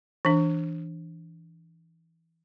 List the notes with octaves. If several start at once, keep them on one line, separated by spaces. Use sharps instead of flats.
E3 D4